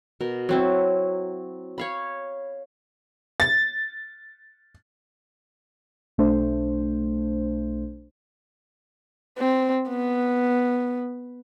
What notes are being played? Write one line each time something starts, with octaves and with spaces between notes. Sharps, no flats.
B2 A#4
F#3 C4 E4
C#5 F5 B5
A6
B1 A3 D4 C5
C4
B3